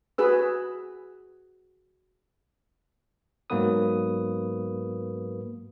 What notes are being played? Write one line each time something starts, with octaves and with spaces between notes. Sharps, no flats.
F#4 G#4 B4 E6
G#2 F#3 A#3 B3 B4 D#6